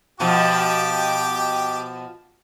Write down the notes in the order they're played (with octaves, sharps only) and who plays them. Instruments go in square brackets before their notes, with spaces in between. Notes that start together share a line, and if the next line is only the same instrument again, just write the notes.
[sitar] B2 F3 [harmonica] G4 G5 D6